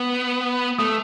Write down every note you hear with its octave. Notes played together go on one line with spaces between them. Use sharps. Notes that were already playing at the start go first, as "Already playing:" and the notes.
Already playing: B3
A3 D#6